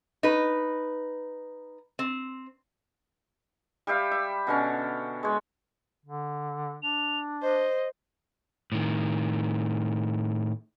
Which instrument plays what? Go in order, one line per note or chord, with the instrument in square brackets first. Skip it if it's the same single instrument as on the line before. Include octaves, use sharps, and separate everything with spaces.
[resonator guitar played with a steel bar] D#4 B4
C4
[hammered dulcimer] G3 G4 E5 F5
E5
B2 D3 C#4
G#3 C#5
[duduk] D3
[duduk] D4 [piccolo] F7
[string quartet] C5 [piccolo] D#5
[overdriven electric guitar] A2 D#3